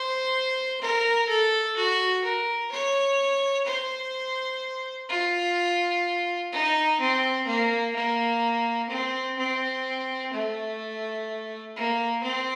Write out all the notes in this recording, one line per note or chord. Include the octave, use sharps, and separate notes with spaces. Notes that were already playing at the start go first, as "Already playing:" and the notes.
Already playing: C5
A#4
A4
F#4
A#4
C#5
C5
F4
D#4
C4
A#3
A#3
C4
C4
A3
A#3
C4